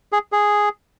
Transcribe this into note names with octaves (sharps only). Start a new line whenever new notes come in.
G#4
G#4